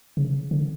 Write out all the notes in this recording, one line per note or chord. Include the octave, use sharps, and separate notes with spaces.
C#3
D3